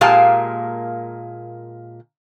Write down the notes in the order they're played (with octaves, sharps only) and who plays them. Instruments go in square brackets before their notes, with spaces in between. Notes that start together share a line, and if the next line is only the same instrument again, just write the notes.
[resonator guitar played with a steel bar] A#2 G#3 A#3 G4 F5 A5